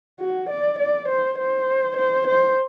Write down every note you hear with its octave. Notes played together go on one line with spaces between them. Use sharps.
F#4
D5
D5
C5
C5
C5
C5